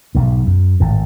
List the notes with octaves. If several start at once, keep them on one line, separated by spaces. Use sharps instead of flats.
B1 G#2
F#2
G#1 A2